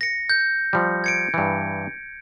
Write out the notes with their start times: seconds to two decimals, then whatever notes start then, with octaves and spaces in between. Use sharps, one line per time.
0.01 A#6 C#7
0.29 G6
0.73 F3 G3
1.04 G#6 C#7 D7
1.34 G2 E3